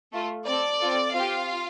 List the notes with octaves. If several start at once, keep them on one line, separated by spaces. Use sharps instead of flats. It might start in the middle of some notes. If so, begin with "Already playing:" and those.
A3 F4 A4
C4 A4 D5
C4 F4 A4
C4 F4 G4 F5